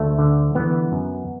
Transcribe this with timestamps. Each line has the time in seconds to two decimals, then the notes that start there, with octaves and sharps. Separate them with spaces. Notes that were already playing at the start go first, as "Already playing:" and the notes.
Already playing: D2 A3
0.19 D3
0.55 E3 B3
0.92 F#2